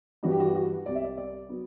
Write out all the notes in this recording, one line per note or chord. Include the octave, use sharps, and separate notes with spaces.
G2 E3 G3 F#4
G4
F#4
G4
F#4
C2 C3 G3 D5
E5
D5
D5
F#3 B3